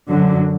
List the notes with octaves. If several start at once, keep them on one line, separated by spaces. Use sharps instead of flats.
F#2 D3 F#3